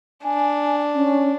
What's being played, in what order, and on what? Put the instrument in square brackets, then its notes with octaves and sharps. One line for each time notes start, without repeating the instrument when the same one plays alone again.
[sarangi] D4 [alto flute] G#5
[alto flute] C#4